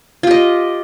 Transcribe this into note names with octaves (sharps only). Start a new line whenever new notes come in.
F4 G4 D#5